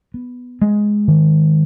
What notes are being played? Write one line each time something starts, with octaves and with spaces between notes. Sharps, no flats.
B3
G#3
D#3